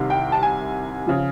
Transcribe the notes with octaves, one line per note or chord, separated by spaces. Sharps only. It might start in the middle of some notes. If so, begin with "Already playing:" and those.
Already playing: C2 C3 D#3
G5
A5
G#5
C#3 F3